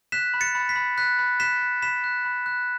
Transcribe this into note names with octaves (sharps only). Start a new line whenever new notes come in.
F#6 B6 E7
B5
A6 C#7
B5
B6
B5
F#6 B6
B5
F#6 B6 E7
F#6
B5 B6 E7
F#6
B5
F#6